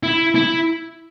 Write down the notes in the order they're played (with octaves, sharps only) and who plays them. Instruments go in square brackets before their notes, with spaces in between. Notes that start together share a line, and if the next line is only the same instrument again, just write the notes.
[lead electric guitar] E4
E4